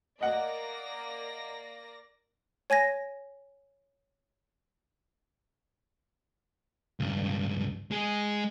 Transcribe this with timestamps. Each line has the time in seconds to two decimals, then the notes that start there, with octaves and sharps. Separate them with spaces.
0.21 A#3 D5 D#5 F#5 A#6
2.70 C#5 G#5 G#6 A#6
7.00 C#2 G2
7.91 G#3 G#4